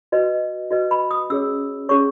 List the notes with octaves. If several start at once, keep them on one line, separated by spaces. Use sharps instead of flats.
F#4 B4 D#5
F#4 B4 D#5
B5
D#6
C#4 G#4 C#5 E6
C#4 G#4 C#5 C#6